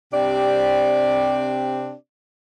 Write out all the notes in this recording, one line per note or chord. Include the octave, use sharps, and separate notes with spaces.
C3 C4 D4 G4 D5